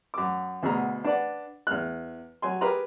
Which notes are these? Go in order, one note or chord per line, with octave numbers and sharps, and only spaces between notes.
F#2 D6
D2 B2 G#4 A#5
D4 B4 D5 F#5
E2 F6 F#6
F#3 G#5 C6
G4 G#4 A#4 B4 A#5 C6